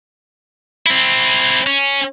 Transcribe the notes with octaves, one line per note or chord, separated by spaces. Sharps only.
C4 E4
C#4